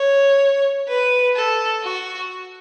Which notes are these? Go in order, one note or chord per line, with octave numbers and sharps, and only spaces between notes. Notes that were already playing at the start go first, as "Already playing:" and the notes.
Already playing: C#5
B4
A4
F#4